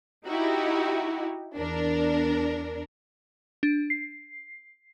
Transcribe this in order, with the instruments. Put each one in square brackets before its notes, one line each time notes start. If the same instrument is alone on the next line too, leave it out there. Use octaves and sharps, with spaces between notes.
[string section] D#4 E4 F#4 G4
E2 D4 A#4
[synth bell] D4
C7